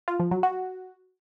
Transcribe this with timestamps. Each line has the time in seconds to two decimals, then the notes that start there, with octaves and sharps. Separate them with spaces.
0.08 F4
0.20 F3
0.31 F#3
0.43 F#4